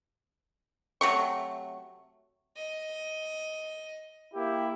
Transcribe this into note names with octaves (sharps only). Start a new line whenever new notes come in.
C3 F#3 A3 C#6
D#5
A#3 E4 G4